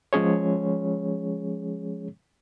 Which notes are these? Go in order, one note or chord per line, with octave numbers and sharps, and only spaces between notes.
F3 G#3 C#4 G#4 C#5